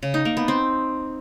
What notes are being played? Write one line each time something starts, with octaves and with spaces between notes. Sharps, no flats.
C#3
D#4
A#3
B3
C4